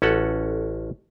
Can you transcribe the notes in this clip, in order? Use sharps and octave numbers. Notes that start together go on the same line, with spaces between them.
A1 C#4 F#4 A4 F#5